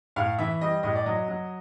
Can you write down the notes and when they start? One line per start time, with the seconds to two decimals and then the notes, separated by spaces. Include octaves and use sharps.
0.16 A2 F5
0.38 E3 E5
0.61 G3 D#5
0.83 A2 D#5
0.96 D5
1.06 F#3 D#5
1.28 F#3